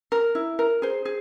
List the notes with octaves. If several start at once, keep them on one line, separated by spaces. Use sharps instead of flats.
A#4
E4
A#4
G#4 C5
G#4